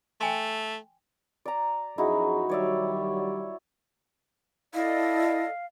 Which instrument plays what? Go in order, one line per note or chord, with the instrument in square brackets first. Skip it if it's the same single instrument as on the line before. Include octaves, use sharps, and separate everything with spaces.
[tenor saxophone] A3 [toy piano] G5 G#5 C6
[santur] D5 A#5
[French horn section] F#2 F3 G#4 [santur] D#4 E4 F#4
[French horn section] D#3 F#3 G3 [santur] C#5 D5 E5
[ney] E4 [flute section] A4 D5 D#5 [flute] F5